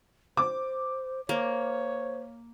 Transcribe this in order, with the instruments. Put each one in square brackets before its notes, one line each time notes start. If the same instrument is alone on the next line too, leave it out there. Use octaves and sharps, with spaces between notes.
[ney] C5 [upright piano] D6
[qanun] A#3 [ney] C5 [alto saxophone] C#5